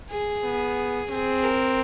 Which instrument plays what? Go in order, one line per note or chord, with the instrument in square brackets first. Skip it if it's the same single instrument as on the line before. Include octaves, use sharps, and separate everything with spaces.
[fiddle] G#4
[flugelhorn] B3
[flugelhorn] C4 [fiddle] G#4
[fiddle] A#4